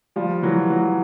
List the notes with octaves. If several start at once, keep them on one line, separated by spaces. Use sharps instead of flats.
F3 G3
E3 F#3
E3 F#3